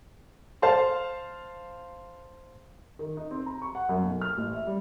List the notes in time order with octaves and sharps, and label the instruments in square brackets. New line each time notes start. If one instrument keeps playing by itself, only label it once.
[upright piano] C5 F5 A5 C6
D#3
D#4
C4
A#5
C#6
F#5
F#2
B1
F6
A1
E5
G3